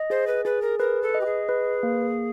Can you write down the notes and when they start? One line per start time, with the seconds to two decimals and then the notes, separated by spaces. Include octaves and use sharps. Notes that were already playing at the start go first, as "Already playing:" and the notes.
Already playing: D#5
0.10 G#4 C5
0.27 B4
0.45 G#4 B4
0.62 A#4
0.79 A#4 B4
1.02 A4
1.14 D#5
1.21 G4
1.26 G#4
1.49 B4
1.83 A#3